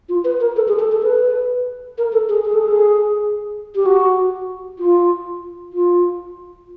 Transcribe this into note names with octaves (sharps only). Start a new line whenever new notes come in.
F4
B4
A#4
A4
G#4
A4
A4
B4
A#4
A4
G#4
G#4
A4
G#4
G4
F#4
F4
F4